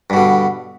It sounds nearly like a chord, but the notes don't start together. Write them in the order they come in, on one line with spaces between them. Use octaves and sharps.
G2 B2 D3